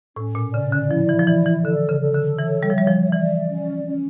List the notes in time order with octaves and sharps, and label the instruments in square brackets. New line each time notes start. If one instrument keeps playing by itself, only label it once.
[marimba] A2 [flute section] C#4
[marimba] A#2
[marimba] C#3 [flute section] D5
[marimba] D3
[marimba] F3 [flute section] E4
[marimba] E3
F3
[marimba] E3 [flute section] D5
[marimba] E3
[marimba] D3 [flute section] A4
[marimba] C#3
[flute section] A4
[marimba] D3
[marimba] E3 [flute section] C#5
[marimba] G3
F3
[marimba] G3 [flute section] E5
[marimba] F3
[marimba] E3 [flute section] D5
[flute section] C#4
C#4